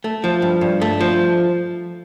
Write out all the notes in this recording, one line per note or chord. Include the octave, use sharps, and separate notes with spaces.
A3
F3
G2
G2
A3
F3